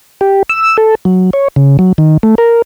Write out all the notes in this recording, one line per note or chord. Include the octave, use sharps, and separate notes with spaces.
G4
E6
A4
F#3
C#5
C#3
F#3
D#3
A3
A#4